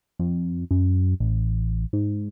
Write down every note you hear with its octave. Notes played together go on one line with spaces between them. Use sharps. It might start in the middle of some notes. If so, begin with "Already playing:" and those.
F2
F#2
A1
G#2